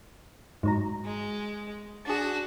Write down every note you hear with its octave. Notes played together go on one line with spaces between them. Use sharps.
G#2 F#3 A#5
G#3
D4 F#4 G#4 A5